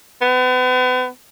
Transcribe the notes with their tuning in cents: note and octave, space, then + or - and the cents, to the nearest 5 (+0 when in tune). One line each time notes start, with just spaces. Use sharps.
B3 +40